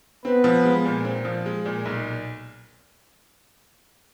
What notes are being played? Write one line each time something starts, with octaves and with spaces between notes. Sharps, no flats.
B3 C4 B4
F3
G#3
A#2
C4
F3
G#3
A#2
B1